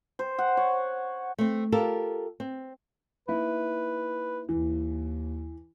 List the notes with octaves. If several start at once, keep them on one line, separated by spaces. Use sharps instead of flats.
C5
F#5
C#5
A3 C4
F4 G4 A4 A#4
C4
A#3 D#4 E4 B4
D#2 E3